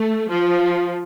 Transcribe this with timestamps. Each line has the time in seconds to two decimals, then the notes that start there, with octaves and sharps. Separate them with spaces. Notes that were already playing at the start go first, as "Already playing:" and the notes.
Already playing: A3
0.30 F3